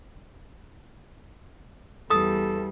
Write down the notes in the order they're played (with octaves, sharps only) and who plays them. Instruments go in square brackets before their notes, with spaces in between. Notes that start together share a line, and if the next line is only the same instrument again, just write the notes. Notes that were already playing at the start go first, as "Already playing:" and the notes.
[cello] E2 G3 [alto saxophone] A4 [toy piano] D#6